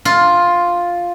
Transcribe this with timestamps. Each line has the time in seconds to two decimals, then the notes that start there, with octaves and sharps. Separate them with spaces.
0.05 F4